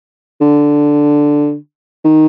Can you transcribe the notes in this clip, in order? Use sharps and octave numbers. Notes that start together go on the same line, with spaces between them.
D3
D#3